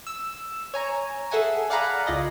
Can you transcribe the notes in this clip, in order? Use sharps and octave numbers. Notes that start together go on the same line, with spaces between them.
E6
C#5 G#5 A#5
G#4 A4 E5 F#5 G#5
D5 F5 F#5 G#5 A#5 B5
C#2 F4 D5 D#5